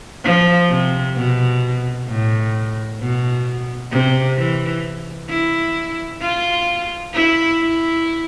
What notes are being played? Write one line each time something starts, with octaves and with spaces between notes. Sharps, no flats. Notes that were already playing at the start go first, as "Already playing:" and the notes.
F3
C3
B2
A2
B2
C3
E3
E4
F4
E4
E4